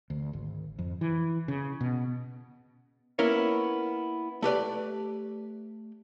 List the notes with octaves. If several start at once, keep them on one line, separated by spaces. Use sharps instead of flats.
D2
G#1
F2
E3
C#3
B2
A#3 B3 C#4 E4 A#4 C#5
A3 G4 B4 D5